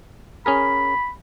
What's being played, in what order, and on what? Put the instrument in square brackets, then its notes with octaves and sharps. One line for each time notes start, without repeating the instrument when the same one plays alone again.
[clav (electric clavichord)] C#4 G#4 A#4 [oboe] B5